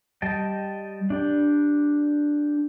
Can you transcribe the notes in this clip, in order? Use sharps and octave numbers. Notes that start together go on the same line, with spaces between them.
G3 D#5 G5 A5
D4 G4